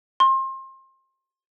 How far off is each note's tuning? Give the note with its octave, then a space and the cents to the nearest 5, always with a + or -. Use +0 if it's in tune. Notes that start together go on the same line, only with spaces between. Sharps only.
C6 +30